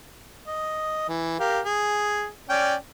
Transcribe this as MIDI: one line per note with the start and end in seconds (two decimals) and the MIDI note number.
0.47 1.06 75
1.09 1.38 52
1.40 1.60 67
1.40 1.60 70
1.40 1.60 77
1.65 2.28 68
2.49 2.75 61
2.49 2.75 74
2.49 2.75 79